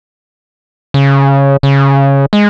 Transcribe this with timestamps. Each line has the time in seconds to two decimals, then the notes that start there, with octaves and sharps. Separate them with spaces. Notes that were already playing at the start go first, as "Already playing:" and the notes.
0.94 C#3
1.63 C#3
2.33 G#3